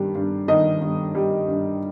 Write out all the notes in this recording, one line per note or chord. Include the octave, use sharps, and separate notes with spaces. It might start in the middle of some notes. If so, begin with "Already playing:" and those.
Already playing: G2 D#3 G3
G2
D#3 D#5
G2
G3
G2